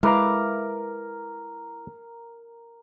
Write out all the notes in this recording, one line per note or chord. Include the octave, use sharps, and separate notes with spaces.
G#3 E4 A#4 B4 F5 A#5 D6 F6